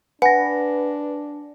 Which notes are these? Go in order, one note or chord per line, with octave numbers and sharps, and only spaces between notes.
D4 B4 F#5 G#5 A#6